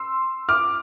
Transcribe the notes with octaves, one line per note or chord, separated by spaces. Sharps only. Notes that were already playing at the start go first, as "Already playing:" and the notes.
Already playing: C6 E6
D6 F6